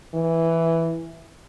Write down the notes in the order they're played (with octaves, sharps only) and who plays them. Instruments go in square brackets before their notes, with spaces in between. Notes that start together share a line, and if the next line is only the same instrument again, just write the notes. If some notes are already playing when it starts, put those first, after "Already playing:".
[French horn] E3